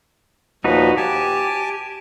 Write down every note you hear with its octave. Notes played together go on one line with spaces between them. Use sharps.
D#2 A#2 F3 D#4 F#4 B4
G4 G#5 A5